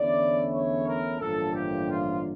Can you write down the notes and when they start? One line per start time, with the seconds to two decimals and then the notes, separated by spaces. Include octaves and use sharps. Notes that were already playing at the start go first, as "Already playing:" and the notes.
Already playing: E2 D3 A3 C#4 E4 D5
0.52 C#5
0.85 A#4
1.19 A1 G2 D3 F3 A#3 A4
1.54 G4
1.88 F4